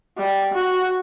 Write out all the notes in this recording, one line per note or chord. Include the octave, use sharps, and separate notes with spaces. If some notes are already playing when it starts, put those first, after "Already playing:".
G3
F#4